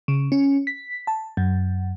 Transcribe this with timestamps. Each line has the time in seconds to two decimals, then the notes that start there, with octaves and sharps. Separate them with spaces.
0.08 C#3
0.32 C#4
0.67 B6
1.07 A5
1.37 F#2